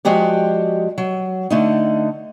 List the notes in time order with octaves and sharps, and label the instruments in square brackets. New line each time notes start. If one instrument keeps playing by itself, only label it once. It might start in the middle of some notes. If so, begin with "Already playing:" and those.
[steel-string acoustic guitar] F3 G#3 F#4 G4 D5
F#3
D3 A3 D#4